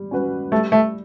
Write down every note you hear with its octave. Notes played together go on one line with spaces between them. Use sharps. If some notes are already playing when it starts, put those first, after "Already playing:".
Already playing: G3
C#4 F#4 B4
G3 A3
A3